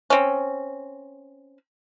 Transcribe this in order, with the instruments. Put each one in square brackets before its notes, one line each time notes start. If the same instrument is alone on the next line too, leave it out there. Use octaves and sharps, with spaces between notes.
[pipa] C4 C#4